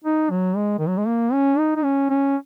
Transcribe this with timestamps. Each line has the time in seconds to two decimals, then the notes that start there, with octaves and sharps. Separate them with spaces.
0.04 D#4
0.30 F#3
0.56 G#3
0.78 D#3
0.88 F#3
0.98 G#3
1.07 A#3
1.33 C#4
1.58 D#4
1.76 D#4
1.84 C#4
2.10 C#4